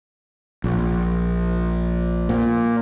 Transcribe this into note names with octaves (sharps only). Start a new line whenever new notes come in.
A#1
A#2